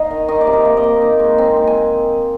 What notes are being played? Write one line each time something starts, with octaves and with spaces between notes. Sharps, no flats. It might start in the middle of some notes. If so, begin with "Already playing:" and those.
Already playing: D#4 D#5 F5
D#3
D#3 D#5
D5
C3
A#4
A#3
D#5
A#3
D#4
G#3
C4
D#3
G#5